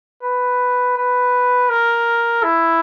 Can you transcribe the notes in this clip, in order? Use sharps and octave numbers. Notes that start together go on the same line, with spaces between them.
B4
B4
A#4
E4